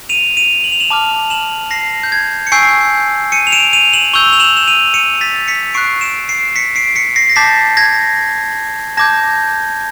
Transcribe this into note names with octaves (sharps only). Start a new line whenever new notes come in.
D#7 F7
D#7 F7
F#7
F7
E7 F#7
A5 D6 F6
E7 F#7
A#6 C7
G6
G#6
C#7
G#5 C#6 E6 G6 C7 D7
C#7 D#7
F7
D7 E7
D#7 F7
E7 F#7
C#6 E6 G6 F7 G7
F7
E7 F#7
E7
D#7 F7
C#7 D#7
A6 B6
B6 C#7
C#6 F#6 C7 D7
D7 E7
C7 D7
B6 C#7
C7 D7
B6 C#7
A#6 C7
A#6
A5 D6 G6 A6 B6
G#6 A#6
A5 D6 G6 G#6 A#6